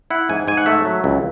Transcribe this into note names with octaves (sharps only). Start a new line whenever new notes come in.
E4 F#5
G#2 G#5
G#2 G#5
F#5
A3 E5
F#3
C#2